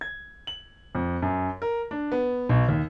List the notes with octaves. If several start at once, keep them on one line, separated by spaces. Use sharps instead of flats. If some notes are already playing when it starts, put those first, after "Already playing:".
G#6
F#7
F2
F#2
A#4
D4
B3
B1
D#2